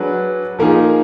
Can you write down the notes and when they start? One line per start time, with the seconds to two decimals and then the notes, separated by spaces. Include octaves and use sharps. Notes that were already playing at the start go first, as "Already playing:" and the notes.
Already playing: F#3 D4 G#4 B4
0.59 F3 A#3 D#4 G#4